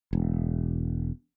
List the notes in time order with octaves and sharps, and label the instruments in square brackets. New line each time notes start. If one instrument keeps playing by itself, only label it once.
[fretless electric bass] E1